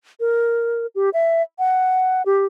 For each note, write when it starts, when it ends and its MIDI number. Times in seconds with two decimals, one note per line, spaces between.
0.20 0.86 70
0.95 1.10 67
1.14 1.42 76
1.59 2.22 78
2.26 2.46 67